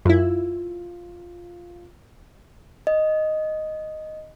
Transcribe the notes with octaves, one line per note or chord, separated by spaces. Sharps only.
F#2 E4 F4
D#5